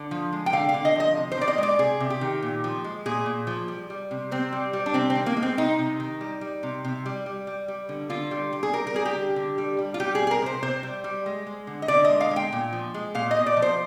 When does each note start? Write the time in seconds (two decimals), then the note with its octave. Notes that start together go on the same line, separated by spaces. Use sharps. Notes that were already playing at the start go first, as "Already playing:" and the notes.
Already playing: D3
0.11 F3
0.32 G#3
0.46 G5
0.52 D3 F5
0.69 F5
0.74 D3
0.85 D#5
0.96 F3 D#5
1.17 C3
1.32 C5
1.38 D#3 D5
1.48 D#5
1.58 G#3 D5
1.79 C3 G#4
2.00 C3
2.10 G4
2.21 D#3
2.42 A#2
2.64 F3
2.84 G#3
3.06 A#2 G#4
3.26 A#2
3.47 F3
3.68 G3
3.90 G3
4.11 C3
4.31 C3 C4
4.52 G3
4.73 G3
4.86 D4
4.94 C3 C4
5.10 C4
5.15 D#3
5.26 A#3
5.37 G#3
5.43 C4
5.57 C3 D#4
5.79 C3
6.00 D#3
6.21 G3
6.41 G3
6.63 C3
6.84 C3
7.06 G3
7.26 G3
7.47 G3
7.68 G3
7.89 D3
8.10 D3 F4
8.31 G3
8.53 G3
8.63 G#4
8.73 G3 A#4
8.87 A#4
8.94 G3 G#4
9.05 G4
9.16 D3
9.36 D3
9.58 G3
9.79 G3
9.94 F4
10.00 G3 G4
10.15 G#4
10.20 G3
10.27 G#4
10.31 A#4
10.42 C3 C5
10.63 C3 C5
10.83 G3
11.04 G3
11.26 G#3
11.47 G#3
11.67 D3
11.82 D#5
11.88 D3 D5
12.05 G#3 D#5
12.21 F5
12.31 G#3
12.36 G5
12.52 A#2
12.73 F3
12.94 G#3
13.15 A#2 F5
13.31 D#5
13.37 A#2
13.46 D5
13.57 F3
13.62 C5